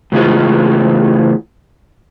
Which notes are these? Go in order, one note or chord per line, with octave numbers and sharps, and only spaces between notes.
A2 C#3 E3 F4 G#4